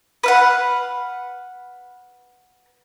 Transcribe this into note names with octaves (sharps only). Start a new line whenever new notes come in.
B4 F5 F#5